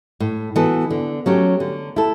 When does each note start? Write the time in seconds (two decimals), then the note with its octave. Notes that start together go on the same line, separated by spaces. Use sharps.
0.20 A2
0.56 E3 B3 F#4 A4
0.90 D3
1.26 F#3 A3 C#4 G4
1.60 D3
1.96 A3 E4 A4